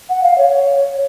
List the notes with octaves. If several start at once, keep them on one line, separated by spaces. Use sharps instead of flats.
F#5
F5
C#5